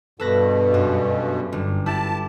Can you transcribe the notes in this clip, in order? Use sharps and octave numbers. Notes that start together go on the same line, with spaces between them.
G2 B2 A4 B4 A#6
F#2
G1
E4 G4 A5